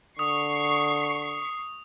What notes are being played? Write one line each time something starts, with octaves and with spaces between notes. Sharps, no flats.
D3 C#6 D#6 C7 C#7